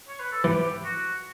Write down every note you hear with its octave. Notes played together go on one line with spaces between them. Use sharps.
C#5
B4
A4
E3 G4
F#4